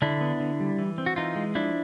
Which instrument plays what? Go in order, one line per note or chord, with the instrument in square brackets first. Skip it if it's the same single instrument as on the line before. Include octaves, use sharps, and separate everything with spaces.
[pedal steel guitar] D3 D4 E4
B3
D3
G3
E3
C4
F#4
E3 D#4 F4
G#3
F3 D4 E4